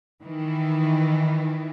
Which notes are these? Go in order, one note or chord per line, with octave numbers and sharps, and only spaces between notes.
D#3 E3